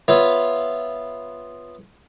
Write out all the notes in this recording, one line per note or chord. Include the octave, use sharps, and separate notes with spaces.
B3 F4 B4 C#5 E5